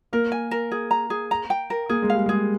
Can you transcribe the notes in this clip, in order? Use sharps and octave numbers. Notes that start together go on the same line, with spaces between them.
A#3 A#4
G#5
A#4
G#4
A#5
G#4
A#5
G5
A#4
A#3 G#4
G#3
F5
G3
G#3 G#4